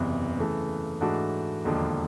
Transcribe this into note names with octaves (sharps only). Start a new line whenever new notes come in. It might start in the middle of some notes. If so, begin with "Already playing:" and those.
Already playing: F#1 E2 C3 E3
C#3 E3 A3
G#2 E3 A3 D4 F#4
E1 D#2 D3 F3